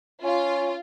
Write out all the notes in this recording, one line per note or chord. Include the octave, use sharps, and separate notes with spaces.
C#4 F4